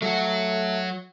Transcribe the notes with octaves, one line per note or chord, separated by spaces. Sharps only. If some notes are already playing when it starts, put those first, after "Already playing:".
F#3 A3 F#4